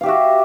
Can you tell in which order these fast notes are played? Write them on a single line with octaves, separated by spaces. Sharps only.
F5 G4 E5 F#4